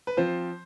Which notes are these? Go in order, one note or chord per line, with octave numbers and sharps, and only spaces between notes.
B4
F3 C4 F4 C5